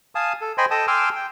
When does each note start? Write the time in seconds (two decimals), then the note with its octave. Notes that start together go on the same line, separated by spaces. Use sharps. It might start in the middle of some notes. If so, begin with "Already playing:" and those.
0.15 F5 G#5 A5 D#6
0.41 A4
0.58 C5 D#5 G5 G#5 B5 C6
0.71 A4 D#5 G5 A5 D#6
0.87 G5 G#5 C6 D6 E6 F6
1.16 G5